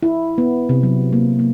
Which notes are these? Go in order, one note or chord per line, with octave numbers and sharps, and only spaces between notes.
E4
B3
C3
F#3
A#3
A#3